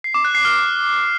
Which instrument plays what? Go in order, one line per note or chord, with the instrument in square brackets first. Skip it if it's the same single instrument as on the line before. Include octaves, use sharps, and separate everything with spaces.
[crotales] C7
D6
F#6
C7
F6